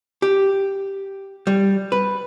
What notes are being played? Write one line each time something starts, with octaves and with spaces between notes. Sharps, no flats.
G4
G3
B4